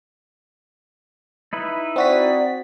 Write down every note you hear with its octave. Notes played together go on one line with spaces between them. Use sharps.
D#4 E4 B4
C4 F#4 D5 B6